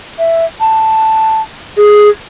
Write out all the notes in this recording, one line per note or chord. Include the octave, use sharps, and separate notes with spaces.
E5
A5
G#4